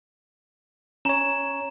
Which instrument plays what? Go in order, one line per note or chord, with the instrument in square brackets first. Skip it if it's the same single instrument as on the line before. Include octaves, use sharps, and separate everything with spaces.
[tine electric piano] C#4 C#5 [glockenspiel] A#5 E7